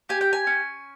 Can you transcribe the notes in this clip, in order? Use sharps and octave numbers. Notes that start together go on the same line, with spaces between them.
G4 G#5
G5
G#5
C#4